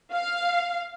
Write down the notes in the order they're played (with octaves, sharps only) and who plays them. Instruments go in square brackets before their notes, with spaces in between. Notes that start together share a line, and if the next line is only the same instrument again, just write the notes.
[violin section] F5